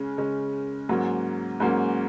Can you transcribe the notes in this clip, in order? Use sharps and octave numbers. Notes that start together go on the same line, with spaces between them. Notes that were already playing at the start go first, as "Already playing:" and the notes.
Already playing: C#3 G#3 C#4
C#3 G#3 C#4
G#2 F#3 A#3 C#4
G#2 F#3 A#3 C#4